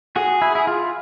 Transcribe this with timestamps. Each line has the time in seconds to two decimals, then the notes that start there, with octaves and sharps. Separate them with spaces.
0.16 F#4 G#4
0.42 E4
0.55 E4
0.67 F4